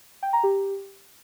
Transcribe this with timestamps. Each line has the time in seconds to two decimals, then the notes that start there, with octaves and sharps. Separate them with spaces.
0.23 G5
0.33 A#5
0.43 G4